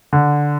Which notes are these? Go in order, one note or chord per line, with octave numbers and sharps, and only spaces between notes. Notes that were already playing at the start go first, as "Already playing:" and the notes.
D3